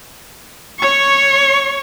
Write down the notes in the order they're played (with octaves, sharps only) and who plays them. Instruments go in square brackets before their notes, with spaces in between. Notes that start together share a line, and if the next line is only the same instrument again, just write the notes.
[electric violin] C#5 C#6